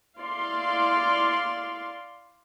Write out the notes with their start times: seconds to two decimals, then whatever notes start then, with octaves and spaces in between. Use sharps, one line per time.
0.19 E4 D5 F5 C6